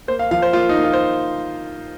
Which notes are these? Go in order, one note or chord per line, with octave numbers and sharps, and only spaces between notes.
A#3 C5
F5
F3 F5
C5
A#3 F4
D#4
A#3
F4
C5